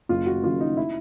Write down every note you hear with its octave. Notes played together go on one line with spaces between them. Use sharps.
F#1 F4
F#4
F#2 C#3 F#3 F4
D#4
E4